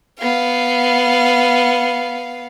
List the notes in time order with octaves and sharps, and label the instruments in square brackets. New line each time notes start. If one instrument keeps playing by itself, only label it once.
[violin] B3 F5